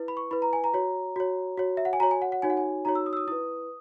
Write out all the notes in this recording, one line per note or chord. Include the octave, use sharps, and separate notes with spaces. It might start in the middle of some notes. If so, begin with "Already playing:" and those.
Already playing: E4 B4
B5
C#6
E4 B4 B5
A#5
G#5
A#5
F#4 C#5
F#4 C#5
F#4 C#5
E5
F#5
G#5
F#4 C#5 A#5
G#5
F#5
F#5
D#4 F#4 C#5 G#5
F#5
G#5
D#4 F#4 C#5 A#5
E6
D#6
E6
D#6
E4 B4 D#6